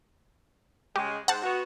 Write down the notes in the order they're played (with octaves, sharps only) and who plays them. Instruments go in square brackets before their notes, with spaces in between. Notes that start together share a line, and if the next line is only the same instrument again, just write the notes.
[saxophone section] C#3 G#3 [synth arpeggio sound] G4
[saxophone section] G#2 C5 [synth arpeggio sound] F#5 A5
[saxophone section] B3 F#4